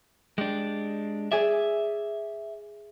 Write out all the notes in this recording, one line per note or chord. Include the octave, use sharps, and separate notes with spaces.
G#3 D4 G4
G#4 D5 E5